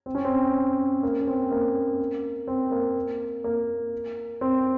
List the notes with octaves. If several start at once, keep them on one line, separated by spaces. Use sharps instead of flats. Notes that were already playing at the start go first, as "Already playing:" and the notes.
C4
C#4
C4
A#3
C#4
C4
A#3
C4
A#3
A#3
C4